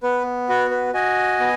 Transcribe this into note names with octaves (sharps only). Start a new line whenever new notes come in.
B3 B4
F#4 B4
B4
F#4 D#5 G#5
B3